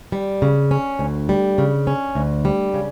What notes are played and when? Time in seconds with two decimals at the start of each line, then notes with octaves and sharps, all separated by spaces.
0.12 G3
0.42 C#3
0.71 C#4
0.99 D2
1.29 G3
1.58 C#3
1.87 C#4
2.15 D2
2.45 G3
2.74 C#3